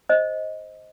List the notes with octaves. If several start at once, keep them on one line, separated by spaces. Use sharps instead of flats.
C5 D#5